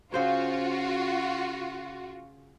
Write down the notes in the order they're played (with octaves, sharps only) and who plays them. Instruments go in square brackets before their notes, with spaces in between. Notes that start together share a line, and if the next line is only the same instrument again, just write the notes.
[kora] C#3 C5 C#5 [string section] F4 F#4